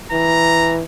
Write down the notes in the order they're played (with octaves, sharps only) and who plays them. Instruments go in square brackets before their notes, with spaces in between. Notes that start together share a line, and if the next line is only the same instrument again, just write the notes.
[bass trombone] E3 [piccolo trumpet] A#5